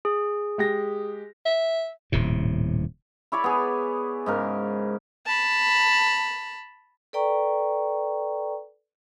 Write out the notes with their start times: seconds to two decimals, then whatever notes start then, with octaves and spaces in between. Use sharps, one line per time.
0.05 G#4
0.58 G#3 G4 A#6
1.46 E5
2.12 D#1 A2 C3
3.32 E4 C#5 D5 B5
3.44 B3 G#4
4.26 G#2 C#3 A#4
5.26 A5 B5
7.13 A4 B4 D5 G5 A#5 C#6